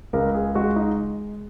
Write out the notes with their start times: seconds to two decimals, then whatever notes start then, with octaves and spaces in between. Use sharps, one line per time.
0.13 C#2 A#4
0.34 G#4
0.55 G#3 F#4
0.76 D#4